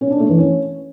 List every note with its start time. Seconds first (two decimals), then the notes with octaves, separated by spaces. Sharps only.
0.01 C#4
0.10 D4
0.20 A3
0.29 E3
0.39 C#4